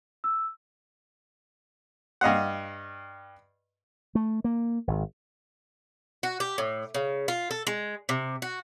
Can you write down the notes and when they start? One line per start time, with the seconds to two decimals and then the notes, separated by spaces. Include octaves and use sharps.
0.24 E6
2.21 G2 D#5 F5 F#5
4.15 A3
4.44 A#3
4.87 G#1
6.23 F#4
6.40 G4
6.58 A2
6.94 C#3
7.28 F4
7.51 A4
7.67 G#3
8.09 C3
8.42 F#4